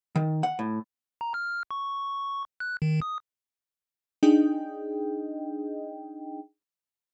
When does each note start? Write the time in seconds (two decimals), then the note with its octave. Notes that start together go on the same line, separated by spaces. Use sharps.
0.16 D#3
0.43 F#5
0.59 A2
1.21 A#5
1.34 F6
1.71 C#6
2.60 F#6
2.82 D#3
3.02 D#6
4.23 D4 D#4 G#4 D#5 G5